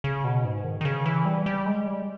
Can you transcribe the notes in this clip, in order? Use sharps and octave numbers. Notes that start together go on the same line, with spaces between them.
C#3
B2
G#2
D#3
D#3
C#3
E3
G3
G3
G#3
G3